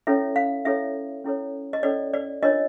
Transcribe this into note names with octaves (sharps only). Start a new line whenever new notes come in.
C#4 E4 A4 C#5 E5
F5
C#4 E4 A4 C#5 E5
C#4 E4 A4 C#5
D#5
C#4 E4 A4 C#5 D5
D5
D4 F4 A#4 C#5 D#5